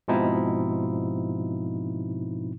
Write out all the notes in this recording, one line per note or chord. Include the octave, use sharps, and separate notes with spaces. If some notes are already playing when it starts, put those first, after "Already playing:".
G#2 B2 F3 C4 D#4 E4